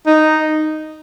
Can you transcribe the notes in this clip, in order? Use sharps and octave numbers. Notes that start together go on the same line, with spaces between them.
D#4